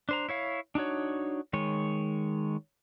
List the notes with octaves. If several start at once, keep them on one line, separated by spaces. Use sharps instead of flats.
D4 C5 A#5
E4 C#5 F5
D4 D#4 F#4 C#5
D#3 G#3 C#5